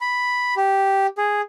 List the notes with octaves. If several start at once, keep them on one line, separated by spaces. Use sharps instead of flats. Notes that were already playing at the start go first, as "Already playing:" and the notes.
B5
G4
G#4